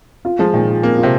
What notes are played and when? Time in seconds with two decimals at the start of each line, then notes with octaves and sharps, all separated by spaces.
0.25 F4
0.39 F3 G#3
0.53 A#2 D#3
0.69 F4
0.83 A#3 C4
0.98 F4
1.03 C3